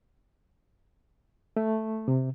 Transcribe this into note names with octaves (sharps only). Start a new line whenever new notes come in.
A3
C3